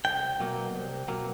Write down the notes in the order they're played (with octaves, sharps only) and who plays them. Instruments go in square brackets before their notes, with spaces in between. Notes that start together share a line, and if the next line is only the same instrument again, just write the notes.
[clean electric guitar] C2 G5
B2 F#3 A#3
C2
B2 F#3 A#3